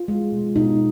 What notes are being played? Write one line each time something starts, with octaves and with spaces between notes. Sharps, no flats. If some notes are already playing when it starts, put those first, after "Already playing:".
Already playing: F4
G#3
B2
B2 D#4